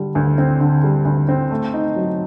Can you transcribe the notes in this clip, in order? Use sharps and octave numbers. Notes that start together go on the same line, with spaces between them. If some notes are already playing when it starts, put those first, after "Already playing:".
Already playing: D3 G3
D2
C4
D3
G3
D2
C4
A3
D#4
F#3